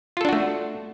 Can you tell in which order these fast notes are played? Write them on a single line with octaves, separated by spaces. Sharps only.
F4 A4 D4 F#4 A3